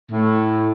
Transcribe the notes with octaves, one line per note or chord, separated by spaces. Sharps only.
A2